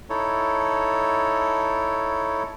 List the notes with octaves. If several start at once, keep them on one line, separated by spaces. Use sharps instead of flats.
D#4 E4 A4 C#5